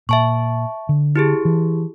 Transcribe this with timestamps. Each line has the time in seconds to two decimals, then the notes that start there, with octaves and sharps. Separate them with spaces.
0.09 A#2 E5 A5 C#6
0.89 D3
1.16 E4 G4 G#4
1.45 E3